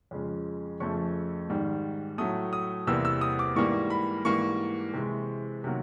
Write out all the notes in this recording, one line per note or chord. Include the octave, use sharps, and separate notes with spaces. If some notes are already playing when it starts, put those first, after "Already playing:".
F2 C#3 F3 G#3
F2 C#3 F3 A3 C#6
G#2 D#3 G3
A2 F#3 A3 D#6
D#6
E2 C3 E3 G3 A#3 E6
E6
D#6
D6
G#2 E3 G3 A#3 C#6
B5
G#2 E3 G3 A#3 C#6
C3 E3 G#3
C3 D#3 F#3 A#3